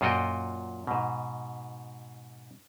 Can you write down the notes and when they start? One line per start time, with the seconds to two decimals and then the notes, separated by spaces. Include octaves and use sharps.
0.01 F#2 A#2 F4 F#4 D#5 G5
0.87 G#2 B2